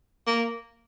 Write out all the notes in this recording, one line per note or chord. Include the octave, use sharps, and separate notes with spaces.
A#3